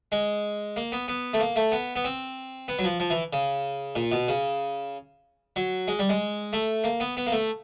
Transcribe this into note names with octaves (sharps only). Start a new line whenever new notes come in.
G#3
A#3
B3
B3
A3
A#3
A3
B3
B3
C4
B3
F#3
F3
F3
E3
C#3
A#2
B2
C#3
F#3
G#3
G3
G#3
A3
A#3
B3
B3
A#3
A3